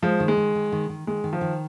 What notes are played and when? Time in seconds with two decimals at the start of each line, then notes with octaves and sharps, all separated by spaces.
0.02 F3 G#3
0.20 D#3
0.28 G#3
0.37 D#3
0.55 D#3
0.72 D#3
0.89 D#3
1.07 D#3 G#3
1.24 D#3
1.33 F3
1.41 D#3